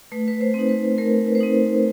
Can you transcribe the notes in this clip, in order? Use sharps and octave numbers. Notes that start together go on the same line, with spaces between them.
A3 B4
B4
C5
C4 D#4
B4
A3 A#4
B4
C5
C4 D#4 B4